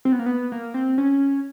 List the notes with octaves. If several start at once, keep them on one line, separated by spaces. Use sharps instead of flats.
C4
B3
A#3
B3
A#3
C4
C#4